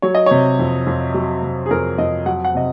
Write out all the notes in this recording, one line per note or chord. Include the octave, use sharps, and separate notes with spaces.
F#3 C#5
D#5
C3 C#5
F2
F2
F#3
C3
G#4
F2 A#4
F2 D#5
F#3 F#5
F#5
C3 D#5